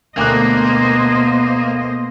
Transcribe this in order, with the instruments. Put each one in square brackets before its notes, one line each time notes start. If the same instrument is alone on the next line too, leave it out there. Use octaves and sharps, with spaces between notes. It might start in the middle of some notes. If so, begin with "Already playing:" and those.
[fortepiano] D2 D6 F#6 [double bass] B2 B3 [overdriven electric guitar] A#3 [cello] C5 D#5